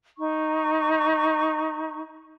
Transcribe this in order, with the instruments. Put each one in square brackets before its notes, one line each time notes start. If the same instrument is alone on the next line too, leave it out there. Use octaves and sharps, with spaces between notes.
[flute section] D#4 C#6